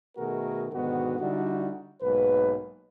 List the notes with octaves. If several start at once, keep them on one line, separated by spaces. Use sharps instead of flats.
B2 D#3 A3 F#4 G#4 A#4
G#2 B2 D3 D#3 B3 F#4
D3 G3 D#4 E4 F#4
B1 G#2 A#3 B4